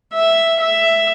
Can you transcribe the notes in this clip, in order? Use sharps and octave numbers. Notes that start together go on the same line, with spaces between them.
E5
E5